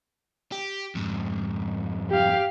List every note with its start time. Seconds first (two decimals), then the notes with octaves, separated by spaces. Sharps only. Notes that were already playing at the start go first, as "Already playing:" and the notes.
0.52 G4
0.95 F2 G#2
2.11 G4 F5